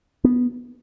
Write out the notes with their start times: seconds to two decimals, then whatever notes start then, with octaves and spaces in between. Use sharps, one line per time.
0.24 B3